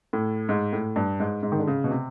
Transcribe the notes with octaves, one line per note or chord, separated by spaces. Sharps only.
A2
G#2
A2
G2
G#2
G#2
D#3
D3
C#3
B2
C3